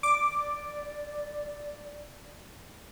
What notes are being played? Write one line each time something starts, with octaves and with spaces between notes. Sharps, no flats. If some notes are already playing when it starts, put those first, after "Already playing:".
D5 D6